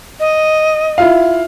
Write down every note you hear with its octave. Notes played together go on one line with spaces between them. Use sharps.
D#5
E4 F4 F5